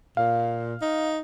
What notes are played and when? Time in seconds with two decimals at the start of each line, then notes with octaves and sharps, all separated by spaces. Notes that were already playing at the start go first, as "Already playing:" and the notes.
0.17 A#2 F5
0.81 D#4